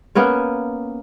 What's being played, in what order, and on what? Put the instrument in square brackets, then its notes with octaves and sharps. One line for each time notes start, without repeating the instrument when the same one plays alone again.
[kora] A#3 B3 C#4 C#5